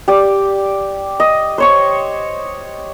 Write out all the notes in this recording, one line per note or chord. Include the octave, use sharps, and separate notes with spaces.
G4 D5
D#5
C5 C#5 C#6